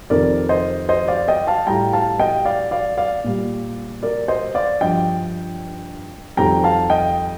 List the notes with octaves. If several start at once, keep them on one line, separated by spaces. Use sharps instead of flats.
F2 C3 D#3 A#4 D5
C5 D#5
C5 D#5
D5 F5
D#5 G5
F5 A5
A2 G3 G5 A#5
F5 A5
D#5 G5
D5 F5
D5 F5
D5 F5
A#2 G3
A#4 D5
C5 D#5
D5 F5
G2 F3 D#5 G5
F2 D#3 G3 G5 A#5
F5 A5
D#5 G5